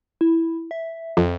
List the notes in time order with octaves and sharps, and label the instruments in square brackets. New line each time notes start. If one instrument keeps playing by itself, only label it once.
[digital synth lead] E4
E5
[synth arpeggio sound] F2